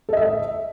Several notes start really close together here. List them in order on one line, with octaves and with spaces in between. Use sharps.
A4 D#5 E5